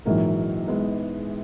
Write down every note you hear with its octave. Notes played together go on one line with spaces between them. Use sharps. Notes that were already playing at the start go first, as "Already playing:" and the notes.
A#1 G#2 E3 F#3 A#3
G#3 B3